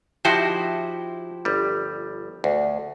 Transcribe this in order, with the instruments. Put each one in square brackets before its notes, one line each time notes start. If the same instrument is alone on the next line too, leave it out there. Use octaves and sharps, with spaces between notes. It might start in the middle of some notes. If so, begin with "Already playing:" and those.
[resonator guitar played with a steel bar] F3 E4 G4 [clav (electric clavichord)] D#4 F#4 C5
[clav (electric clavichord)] G1 G3
D2